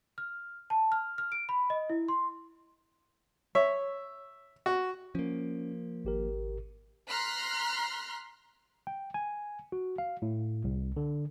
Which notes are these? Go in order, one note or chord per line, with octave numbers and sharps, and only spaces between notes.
F6
A5
F6
F6
D7
B5
D#5
E4
C6
C#5 E5
F#4
F3 A#3 C#4
G#1 G4 A#4
A#5 C6 F6 F#6 B6
G5
G#5
F#4
F5
A2
C2
D3